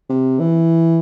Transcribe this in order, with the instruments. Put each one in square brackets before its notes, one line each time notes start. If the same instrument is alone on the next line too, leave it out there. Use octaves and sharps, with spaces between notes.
[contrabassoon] C3
E3